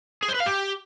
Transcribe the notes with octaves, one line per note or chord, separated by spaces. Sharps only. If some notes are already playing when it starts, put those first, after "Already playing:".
G#4
C5
B4
F5
G4